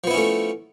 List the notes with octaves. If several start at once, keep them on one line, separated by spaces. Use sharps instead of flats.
F3 A3 B3 C#4 E4